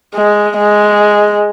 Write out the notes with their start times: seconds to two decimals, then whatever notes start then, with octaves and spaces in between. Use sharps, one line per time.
0.15 G#3
0.58 G#3